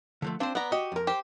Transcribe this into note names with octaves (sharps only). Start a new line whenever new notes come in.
D3 F3 A3
C4 D4 F4 C5
B3 D5 A#5
F#4 G4 D#5
F2 A#4
G4 C5